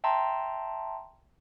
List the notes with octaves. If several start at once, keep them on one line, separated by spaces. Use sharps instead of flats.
E5 G5 A5 A#5 C6